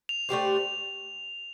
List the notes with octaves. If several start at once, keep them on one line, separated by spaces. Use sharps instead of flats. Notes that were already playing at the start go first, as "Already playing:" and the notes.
F7
A3 D4 G4 C5